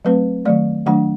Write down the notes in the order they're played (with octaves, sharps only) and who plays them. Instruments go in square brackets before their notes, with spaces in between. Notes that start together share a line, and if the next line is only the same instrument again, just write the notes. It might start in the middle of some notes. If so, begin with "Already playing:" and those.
[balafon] F#3 A3 C4 B4
D#3 F#3 A3 D5
D#3 F#3 A3 D4 F#5